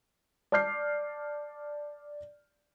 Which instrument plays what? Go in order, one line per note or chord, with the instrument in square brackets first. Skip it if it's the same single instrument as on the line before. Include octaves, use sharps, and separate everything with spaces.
[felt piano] D5 A5 D6 F6 G6 C7